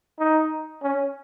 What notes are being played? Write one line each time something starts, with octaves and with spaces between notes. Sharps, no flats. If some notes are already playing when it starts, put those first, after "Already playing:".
D#4
C#4